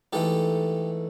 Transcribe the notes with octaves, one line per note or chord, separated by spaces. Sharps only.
G#2 E3 A3 G4 A4